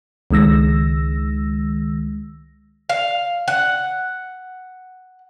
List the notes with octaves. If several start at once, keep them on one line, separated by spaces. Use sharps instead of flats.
C#2 D#3 G#3 E6 A#6
F5
F#5